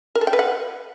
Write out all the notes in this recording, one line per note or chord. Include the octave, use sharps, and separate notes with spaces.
A#4
A4
G5
B4
F#5